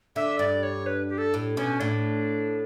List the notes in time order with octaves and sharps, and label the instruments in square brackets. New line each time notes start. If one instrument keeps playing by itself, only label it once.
[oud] D3 [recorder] E5
[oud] G2 [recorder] D5
[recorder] C#5
B4
G4
A4
[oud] A2
[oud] B2 [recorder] C#4
[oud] A2 [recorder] D4